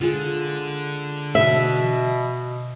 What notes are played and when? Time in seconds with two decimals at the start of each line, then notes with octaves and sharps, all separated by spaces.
0.01 D3 G#3 F4
1.35 B2 E5